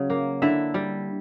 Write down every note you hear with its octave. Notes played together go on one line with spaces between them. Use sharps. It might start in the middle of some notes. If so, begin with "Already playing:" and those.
Already playing: C#3 F#3
A#3
D3 E4 E5
G3